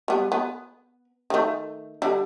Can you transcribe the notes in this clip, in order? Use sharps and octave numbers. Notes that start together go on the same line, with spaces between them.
G3 B3
B3
D#3 A3
D3 G3